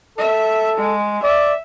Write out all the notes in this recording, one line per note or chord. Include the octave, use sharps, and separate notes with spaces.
A4 E5
G#3
D5 E5